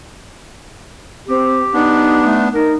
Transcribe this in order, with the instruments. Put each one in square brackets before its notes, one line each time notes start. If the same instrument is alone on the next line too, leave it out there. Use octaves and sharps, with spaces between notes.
[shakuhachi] C4 [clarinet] G4
[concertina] B3 D4 [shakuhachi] D#4
[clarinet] A3
[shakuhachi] D#4 [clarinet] A#4